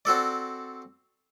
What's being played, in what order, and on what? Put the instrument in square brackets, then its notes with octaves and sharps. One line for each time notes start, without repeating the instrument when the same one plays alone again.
[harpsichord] C4 F#4 A4 D5